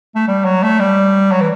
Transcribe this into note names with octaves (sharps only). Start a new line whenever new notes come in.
A3
G3
F#3
A3
G3
F#3
E3